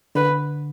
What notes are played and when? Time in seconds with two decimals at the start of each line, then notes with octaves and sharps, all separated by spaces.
0.15 D3 B4